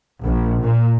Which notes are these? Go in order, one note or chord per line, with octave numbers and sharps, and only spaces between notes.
A#1
A#2